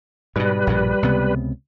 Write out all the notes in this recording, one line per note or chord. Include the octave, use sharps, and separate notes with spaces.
G#2 B2 G3 B4
A#1 G2 B2
C#2 C3 B3